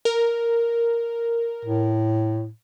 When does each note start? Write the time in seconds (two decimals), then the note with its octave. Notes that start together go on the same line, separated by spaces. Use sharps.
0.05 A#4
1.65 A2